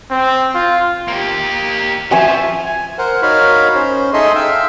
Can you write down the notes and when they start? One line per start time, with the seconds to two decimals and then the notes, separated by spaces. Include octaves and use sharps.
0.11 C4
0.55 F4
1.08 A#3 G4
2.11 F3 E5 G#5 C#6
2.66 G#5
2.98 A#4 C5 F#5
3.22 D#4 F#4 A#4 C#5 F5 B5
3.75 C#4 C5
4.13 D#4 G#4 A4 D#5 E5 C6
4.35 E5 F5 G5 E6